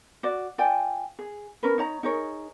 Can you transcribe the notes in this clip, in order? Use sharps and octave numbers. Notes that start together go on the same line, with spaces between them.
F#4 D5
F4 D5 G5 G#5
G#4
C#4 A#4 B4
D#4 C#5 A#5
D#4 G#4 A#4 C#5